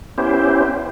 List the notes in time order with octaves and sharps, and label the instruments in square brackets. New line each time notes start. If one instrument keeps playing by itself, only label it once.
[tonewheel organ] B3 C#4 E4 G4 C5